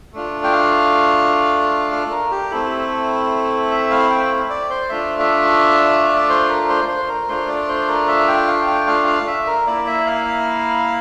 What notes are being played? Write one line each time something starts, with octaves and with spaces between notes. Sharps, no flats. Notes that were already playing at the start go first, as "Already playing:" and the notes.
A3 D4 F4
G5
F5
A4
A#4
G4
A3 C4 E4 A4
E5
F5
G5
D5
C5
A3 D4 F4 E5
E5
D5
C5
A#4
C5
C5
A#4
A3 D4 F4 C5
D5
C5
A#4
E5
G5
F5
G5
F5
F5
E5
A#4
A#3 E4 D5
E5
F5